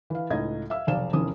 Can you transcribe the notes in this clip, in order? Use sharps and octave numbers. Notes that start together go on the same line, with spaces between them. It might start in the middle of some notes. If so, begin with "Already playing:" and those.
E3 F5
C#2 A2 D#4 D#5 G#6
E5 F5 E6
F1 B1 D5 F5 E7
F1 E2 D#3 C#4 D#6